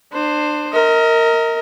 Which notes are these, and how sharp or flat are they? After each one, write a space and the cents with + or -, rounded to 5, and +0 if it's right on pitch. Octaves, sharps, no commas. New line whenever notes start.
D4 +30 C5 +5
A#4 -10 D#5 +35